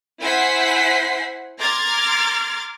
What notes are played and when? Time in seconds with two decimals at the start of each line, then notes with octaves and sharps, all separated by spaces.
0.20 E4 C5 F#5 G#5 B6 C7
1.60 A#5 C6 D6 F6 G#6 A6